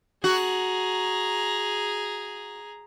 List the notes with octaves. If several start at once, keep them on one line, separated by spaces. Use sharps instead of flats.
F#4 G#4 A#5